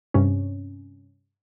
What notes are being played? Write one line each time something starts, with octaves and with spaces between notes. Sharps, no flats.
G2 C3 C#4